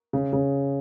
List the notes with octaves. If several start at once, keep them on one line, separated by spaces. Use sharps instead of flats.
C#3
C#3